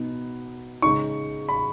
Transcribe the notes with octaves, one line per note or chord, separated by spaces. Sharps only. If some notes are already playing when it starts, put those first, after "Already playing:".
Already playing: B2 B3 D#4
C#3 G#3 D#4 C#6
B5